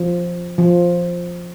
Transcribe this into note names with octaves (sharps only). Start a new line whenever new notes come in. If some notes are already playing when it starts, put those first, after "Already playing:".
Already playing: F3
F3